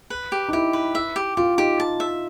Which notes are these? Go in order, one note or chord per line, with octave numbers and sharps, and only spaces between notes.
B4
G4
D#4
E4 G4
B4
E5
G4
F4 G4
D#4 G4
A5
E5